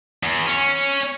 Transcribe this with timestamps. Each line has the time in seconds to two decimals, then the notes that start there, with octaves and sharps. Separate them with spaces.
0.23 E2
0.46 C#4